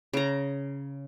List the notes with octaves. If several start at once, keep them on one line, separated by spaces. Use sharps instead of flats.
C#3 A#5